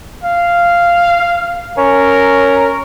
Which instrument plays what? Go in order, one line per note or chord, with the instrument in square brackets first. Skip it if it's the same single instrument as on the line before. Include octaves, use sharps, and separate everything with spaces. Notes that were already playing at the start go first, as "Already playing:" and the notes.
[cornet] F5
[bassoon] C#4 [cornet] A#4